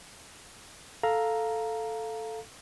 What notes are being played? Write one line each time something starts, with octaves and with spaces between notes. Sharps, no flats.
A4 F5 A#5